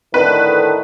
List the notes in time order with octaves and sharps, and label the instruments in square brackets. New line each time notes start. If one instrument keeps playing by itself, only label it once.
[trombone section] A2 D3 D#3 [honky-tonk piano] B4